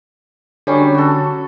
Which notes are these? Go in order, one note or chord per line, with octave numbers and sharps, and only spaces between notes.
D3 F#3 G3 C#4
F#4 A4